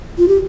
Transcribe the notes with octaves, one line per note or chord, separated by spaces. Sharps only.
F4
G4